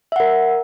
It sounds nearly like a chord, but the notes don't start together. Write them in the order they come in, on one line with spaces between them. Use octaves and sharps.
E5 F#5 A#4